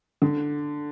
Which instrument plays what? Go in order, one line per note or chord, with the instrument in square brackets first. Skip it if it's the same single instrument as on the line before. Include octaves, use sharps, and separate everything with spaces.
[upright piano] D3